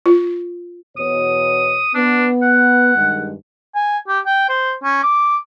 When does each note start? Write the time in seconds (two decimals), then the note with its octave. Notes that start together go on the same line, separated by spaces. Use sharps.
0.06 F4
0.97 E2 B2 C#5 D#6
1.94 B3 D4
2.43 F#5
2.94 G2 D#3 G#3
3.75 G#5
4.08 G4
4.26 G5
4.49 C5
4.83 C#4
5.03 D6